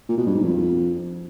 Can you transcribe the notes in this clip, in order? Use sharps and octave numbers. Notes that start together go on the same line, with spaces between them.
A#2
B2
G2
G#2
F2